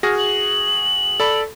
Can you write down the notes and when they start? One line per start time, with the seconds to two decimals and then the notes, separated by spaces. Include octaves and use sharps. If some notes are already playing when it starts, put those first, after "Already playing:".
0.03 F#4 G#4 F6 A#6
0.18 F#7
1.20 A4 D5 B5